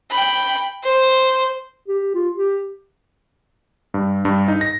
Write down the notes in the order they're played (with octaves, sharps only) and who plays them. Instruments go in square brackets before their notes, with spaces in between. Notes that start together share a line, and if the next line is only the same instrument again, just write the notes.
[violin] G5 B5
C5
[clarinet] G4
F4
G4
[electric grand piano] G2
G2
D#4
A#6